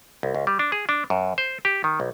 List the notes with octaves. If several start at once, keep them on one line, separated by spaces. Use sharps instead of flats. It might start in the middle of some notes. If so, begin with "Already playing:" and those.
C2
C#2
G3
D4
G#4
D4
F#2
C5
G4
D#3
B1